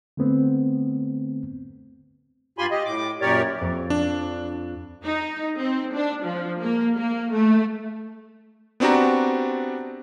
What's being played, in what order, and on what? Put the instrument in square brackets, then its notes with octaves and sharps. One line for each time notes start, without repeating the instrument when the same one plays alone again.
[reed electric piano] D3 A3 B3 C4
[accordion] G2 F4 G4 G#5 B5 C6
G4 D#5
A2 D6
F#2 A#2 G4 A#4 C#5 D5
[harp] F2 D6
[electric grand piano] D4
[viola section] D#4
C4
D4
F3
A#3
A#3
A3
[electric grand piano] B3 C4 D4 F#4 G4 A#5